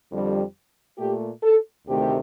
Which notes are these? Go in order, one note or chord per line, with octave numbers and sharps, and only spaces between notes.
F2 D3 G3
A#2 A3 G4
A4
D2 C3 D#3 A3 G4